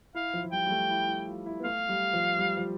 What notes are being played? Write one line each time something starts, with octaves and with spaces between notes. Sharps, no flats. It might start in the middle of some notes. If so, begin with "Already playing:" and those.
E4 F5
F3
F3
G3 G5
G3
A3
E4
E4
F4
E4
B3
A3 F5
G3
F3
G3
F3